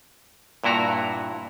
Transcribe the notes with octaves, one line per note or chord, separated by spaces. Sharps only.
G2 A#2 E4 F#4 A#5